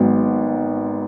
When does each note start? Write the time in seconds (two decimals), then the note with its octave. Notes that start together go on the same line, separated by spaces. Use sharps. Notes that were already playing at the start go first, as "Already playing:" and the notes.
Already playing: G#1 G#2 F#3 B3